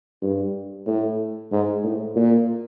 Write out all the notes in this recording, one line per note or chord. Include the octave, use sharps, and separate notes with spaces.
G2
A2
G#2
A2
A#2